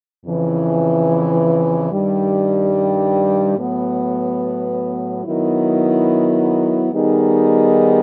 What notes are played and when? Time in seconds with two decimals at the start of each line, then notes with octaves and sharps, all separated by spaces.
0.24 F2 C#3 E3
1.91 G2 D#3 G3
3.58 A2 F#3 B3
5.25 D#3 F#3 B3 E4
6.92 D#3 G3 B3 D#4 G#4